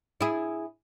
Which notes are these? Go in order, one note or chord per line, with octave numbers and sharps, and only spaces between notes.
E4 G#4